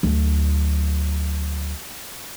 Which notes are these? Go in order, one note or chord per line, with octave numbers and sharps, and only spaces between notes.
D2 F#3